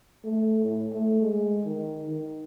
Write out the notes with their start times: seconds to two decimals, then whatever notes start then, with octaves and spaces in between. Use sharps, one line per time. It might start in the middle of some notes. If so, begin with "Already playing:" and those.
0.24 A3
0.63 A2
0.93 A3
1.22 G#3
1.65 D#3
2.08 D#3